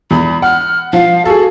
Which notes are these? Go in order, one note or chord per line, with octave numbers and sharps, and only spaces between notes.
E2 B5
F#5 F6
F3 F5
F#4 G#4 A4